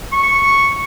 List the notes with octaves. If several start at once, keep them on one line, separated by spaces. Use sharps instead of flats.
C#6